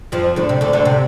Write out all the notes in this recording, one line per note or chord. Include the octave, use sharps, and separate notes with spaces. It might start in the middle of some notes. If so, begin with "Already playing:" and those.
F2 F3
D2 D3
C3
D2 D3
D2 D3
C3